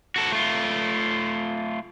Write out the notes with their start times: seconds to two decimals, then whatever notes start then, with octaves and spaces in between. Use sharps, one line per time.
0.16 F#4 A4
0.32 A3 F4